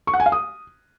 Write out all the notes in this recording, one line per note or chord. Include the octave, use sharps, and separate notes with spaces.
C#6
F#5
G#5
F5
D#6